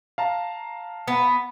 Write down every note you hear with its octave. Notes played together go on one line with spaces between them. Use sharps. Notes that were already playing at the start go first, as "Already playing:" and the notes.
F5 A5 A#5
B3